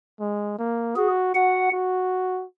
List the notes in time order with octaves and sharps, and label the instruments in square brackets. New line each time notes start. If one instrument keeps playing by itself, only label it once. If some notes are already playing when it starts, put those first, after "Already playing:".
[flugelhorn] G#3
A#3
[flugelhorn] F#4 [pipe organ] G#4
[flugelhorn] F#4 [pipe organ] F#5
[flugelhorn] F#4